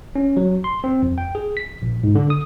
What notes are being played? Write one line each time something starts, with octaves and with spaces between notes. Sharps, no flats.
C#4
F#3
C6
C4
F2
G5
G#4
B6
A#1
G#2
D3
D#6